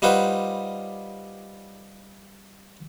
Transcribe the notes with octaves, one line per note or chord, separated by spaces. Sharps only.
G3 D#4 F4 B4 C5 F#5